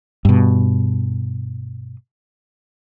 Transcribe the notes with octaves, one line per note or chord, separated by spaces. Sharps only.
G2 B2